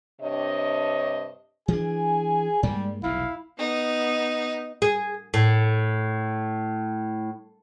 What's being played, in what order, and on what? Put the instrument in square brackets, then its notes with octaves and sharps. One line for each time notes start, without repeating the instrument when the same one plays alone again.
[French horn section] G2 C3 D4 C#5 D#5
[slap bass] E3 D4 [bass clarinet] G#4 [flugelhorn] G#5
[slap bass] G2 G#3 A#3 [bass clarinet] G3
[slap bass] F1 B1 E2 [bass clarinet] E4 [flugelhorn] F5
[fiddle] B3 D#4
[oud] G#4
A2